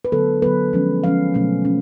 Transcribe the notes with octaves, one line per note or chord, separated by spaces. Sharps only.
B4
D3 F#3 B3 A4
D3 F#3 B3 B4
F3 G#3 C#4
F3 G#3 C#4 F5
B2 F#3 A3 C#4
C#4